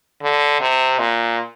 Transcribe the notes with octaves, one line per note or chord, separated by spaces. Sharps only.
D3
C3
A#2